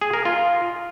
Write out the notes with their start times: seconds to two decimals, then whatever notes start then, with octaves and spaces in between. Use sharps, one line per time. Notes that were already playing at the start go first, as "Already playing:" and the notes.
0.01 G#4
0.13 A#4
0.25 F4